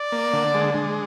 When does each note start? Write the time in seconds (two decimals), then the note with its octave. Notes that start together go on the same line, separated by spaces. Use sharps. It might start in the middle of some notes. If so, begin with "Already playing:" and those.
Already playing: D5
0.12 A#3
0.33 D3
0.54 G#3
0.74 G#3